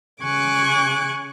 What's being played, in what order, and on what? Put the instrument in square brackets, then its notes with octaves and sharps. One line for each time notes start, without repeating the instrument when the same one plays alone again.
[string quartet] C#3 G#5 C#6 D6 F#6